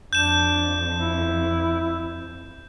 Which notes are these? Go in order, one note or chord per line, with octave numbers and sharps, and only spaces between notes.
F2 D4 G6 E7
E4